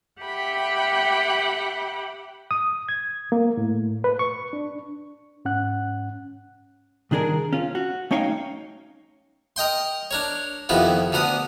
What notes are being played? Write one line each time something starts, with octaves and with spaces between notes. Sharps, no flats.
G4 E5 F#5 G5 B5
D#6
G#6
A#3
A2
B4
C#6
D4
G#2 C#4 F#5 F#6
C2 D#3 D4 G#4 A#4
C#4 F4
F#4
A3 C#4 D#4 C#5 F5 G5
A#4 D#5 G5 C6
D4 A#4 C#5
F2 C3 D#3 B3 E4
D2 D3 B3 A#4 D#6